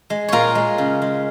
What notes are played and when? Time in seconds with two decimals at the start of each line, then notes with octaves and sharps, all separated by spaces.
0.10 G#3
0.28 A#2 F4 A#4 C#5
0.55 G#3
0.78 C#3
1.02 G#3